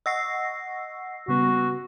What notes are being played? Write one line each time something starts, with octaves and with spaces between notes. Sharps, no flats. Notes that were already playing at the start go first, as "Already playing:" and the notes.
D#5 F#5 C#6 E6 A#6 C7
C#3 G3 B3 F#4